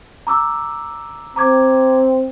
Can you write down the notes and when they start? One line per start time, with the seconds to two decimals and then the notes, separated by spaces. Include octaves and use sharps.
0.27 A#5 D6 E6
1.36 C4 A#5 D6 G#6